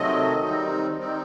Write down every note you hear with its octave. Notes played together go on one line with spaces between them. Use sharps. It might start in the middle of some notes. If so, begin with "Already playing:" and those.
Already playing: C3 D#3 F#3 A3 C4 D#5
D#3 G3 C4 D#4
D#3 G3 C4 D#4